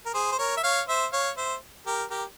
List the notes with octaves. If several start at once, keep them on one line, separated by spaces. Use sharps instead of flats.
A#4
G#4 C5
C5
A#4 C#5
E5
C#5 F5
C5 E5
C#5 F5
C5 E5
G4 A#4
G4 A#4